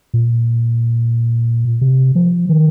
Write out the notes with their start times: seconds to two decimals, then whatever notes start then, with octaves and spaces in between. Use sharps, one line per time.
0.14 A#2
1.81 C3
2.15 F3
2.49 D#3